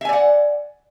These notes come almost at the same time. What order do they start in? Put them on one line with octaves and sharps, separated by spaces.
E5 G#5 D5 F#5